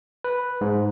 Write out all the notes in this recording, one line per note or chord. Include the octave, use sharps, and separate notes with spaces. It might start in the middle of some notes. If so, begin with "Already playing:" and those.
B4
G#2